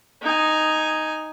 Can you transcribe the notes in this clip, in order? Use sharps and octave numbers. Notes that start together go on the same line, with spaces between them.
D#4 G#5